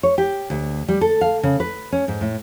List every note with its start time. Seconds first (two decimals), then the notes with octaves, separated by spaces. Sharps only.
0.03 C#5
0.18 G4
0.50 D2
0.88 G3
1.01 A4
1.21 F5
1.43 C#3
1.60 B4
1.92 C#4
2.08 G#2
2.21 A2